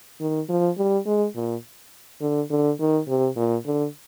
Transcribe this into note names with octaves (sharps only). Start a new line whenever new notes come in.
D#3
F3
G3
G#3
A#2
D3
D3
D#3
C3
A#2
D3